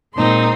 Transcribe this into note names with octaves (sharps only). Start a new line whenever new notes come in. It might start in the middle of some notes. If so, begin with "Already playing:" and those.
A#2 G#3 C4 D#4 C6